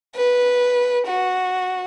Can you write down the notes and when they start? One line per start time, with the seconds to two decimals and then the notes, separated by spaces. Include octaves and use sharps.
0.15 B4
1.07 F#4